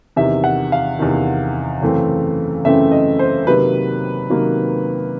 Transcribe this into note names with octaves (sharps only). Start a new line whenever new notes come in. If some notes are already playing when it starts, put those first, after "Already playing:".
E2 C3 D#3 E5
F#5
F5
E2 C3 D#3
F#2 C#3 E3 A3 C4
F#2 C#3 E3 A3 C4 E5
D#5
C5
C3 D#3 F#3 A#3 B4
C3 D#3 F#3 A#3